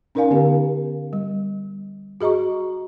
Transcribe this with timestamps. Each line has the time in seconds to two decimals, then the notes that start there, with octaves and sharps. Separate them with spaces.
0.15 C#4 D#4 A#4 D5 F5 G#5
0.31 D3 B3 D#4 G4
1.13 G3
2.21 F#4 G#4 D#5 A#5 C#6